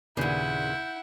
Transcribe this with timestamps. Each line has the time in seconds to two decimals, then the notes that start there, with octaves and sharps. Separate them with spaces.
0.17 D#2 A#2 C#3 D4 E4 B4 F#5 G6